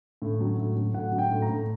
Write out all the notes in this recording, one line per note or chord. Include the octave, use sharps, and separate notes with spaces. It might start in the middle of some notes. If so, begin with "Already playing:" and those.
A2
F#3
A2
F#3
A2 F#5
F#3
G5
A2
A#5
A2